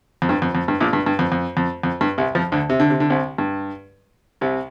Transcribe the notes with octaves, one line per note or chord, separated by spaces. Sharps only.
F2
G2
F2
F2
G2
A#1 A#2
G2
G2
F2
F2
F2
F2
G2
C2 C3
F2 F3
D2 D3
C3
D3
C3
D3
C2 C3
G2
C2 C3